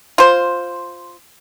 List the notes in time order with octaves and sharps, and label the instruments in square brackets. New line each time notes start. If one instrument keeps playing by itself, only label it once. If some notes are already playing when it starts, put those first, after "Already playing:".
[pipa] F4 C5